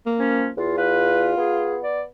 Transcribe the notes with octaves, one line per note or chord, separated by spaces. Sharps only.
A#3
F3 C#4
E2 F4
F4 B4
B3 G#4
D5